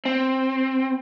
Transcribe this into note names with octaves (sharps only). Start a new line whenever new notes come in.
C4